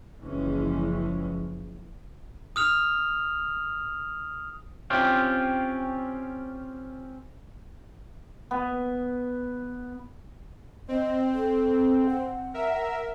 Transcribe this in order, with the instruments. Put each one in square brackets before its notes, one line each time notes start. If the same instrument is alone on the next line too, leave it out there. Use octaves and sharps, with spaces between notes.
[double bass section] F#1 E3 F3 G#3 C#4
[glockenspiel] D#6 F6 F7
[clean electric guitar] C4 C#4 F4 G4
[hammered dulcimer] B3
[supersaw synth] C4 [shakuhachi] D#5
[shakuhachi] A4
F#5
[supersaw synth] A#4 E5